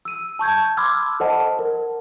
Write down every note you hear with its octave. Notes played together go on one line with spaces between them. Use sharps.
E6 D#7
A5 C#6 G6 G#6
B5 C6 D6 E6 F6 G#6
A4 C5 D#5 F#5 A5
A#4